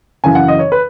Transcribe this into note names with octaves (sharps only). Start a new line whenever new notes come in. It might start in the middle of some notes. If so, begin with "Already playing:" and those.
F#2 C#3 E3 G#5
F#5
D#5
C#5
B4